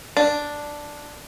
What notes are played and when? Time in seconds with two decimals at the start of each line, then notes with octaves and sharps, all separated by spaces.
0.17 D4